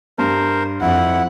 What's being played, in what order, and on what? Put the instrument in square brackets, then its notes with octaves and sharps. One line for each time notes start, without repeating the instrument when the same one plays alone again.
[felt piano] G2 [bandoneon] A#4 C5
[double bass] F2 [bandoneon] E4 [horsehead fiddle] F#5